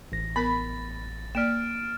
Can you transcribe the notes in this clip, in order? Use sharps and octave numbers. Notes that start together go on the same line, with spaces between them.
A1 A#6
B3 A#4 B5 A6
A#3 D5 F6 D7 E7